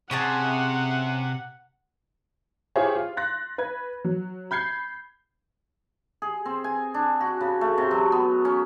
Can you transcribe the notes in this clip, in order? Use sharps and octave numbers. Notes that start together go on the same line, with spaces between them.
C3 C#4 G#4 F#5 A5
E4 F4 G4 G#4 C5 C#5
F4
C6 F#6 A6 A#6
B4 G#6
F#3
B5 G6 G#6 C7
G#4
C4
G#5
D4
F#4
C#3
A3
C3
F#3
B3
C#4